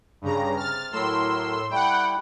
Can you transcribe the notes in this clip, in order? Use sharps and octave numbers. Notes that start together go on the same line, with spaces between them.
G2 C#3 A#5
C3 F6 A6
A2 F#3 A#4 C6 E6
G3 A3 E4 F#5 G5